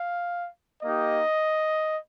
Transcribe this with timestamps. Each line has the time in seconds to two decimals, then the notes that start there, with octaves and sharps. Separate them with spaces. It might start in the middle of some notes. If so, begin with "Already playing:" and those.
Already playing: F5
0.83 A#3 D#4 G4 D#5